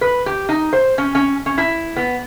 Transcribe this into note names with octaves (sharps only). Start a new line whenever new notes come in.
B4
G4
D#4
C5
C#4
C#4
C#4
E4
B3